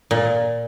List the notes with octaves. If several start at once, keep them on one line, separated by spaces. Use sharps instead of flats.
A#2